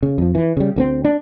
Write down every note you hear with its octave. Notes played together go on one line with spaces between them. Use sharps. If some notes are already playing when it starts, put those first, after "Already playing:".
C#3
F2 F3
E3
C#3 G3
D2 A#3 C4
D4